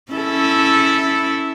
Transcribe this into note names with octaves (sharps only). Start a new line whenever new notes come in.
C#4 E4 A4